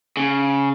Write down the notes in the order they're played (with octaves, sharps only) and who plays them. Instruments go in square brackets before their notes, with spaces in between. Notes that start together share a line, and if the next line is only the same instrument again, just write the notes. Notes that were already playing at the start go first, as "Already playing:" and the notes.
[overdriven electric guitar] C#3